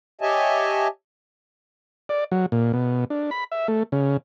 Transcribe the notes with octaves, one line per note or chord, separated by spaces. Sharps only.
G4 C#5 D#5 E5 G#5 A5
D5
F#3
A#2
B2
D4
B5
E5
A3
C#3